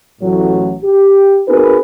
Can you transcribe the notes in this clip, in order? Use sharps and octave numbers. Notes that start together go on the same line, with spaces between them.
A1 A2 F#3
G4
C4 D#4 F#4 G#4 A#4 B4